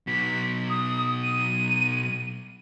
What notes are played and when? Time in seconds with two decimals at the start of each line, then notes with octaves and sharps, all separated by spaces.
0.07 B2 F#3 B6
0.70 D#6
1.23 D#7